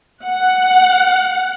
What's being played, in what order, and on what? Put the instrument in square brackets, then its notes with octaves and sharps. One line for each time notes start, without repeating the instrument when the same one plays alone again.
[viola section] F#5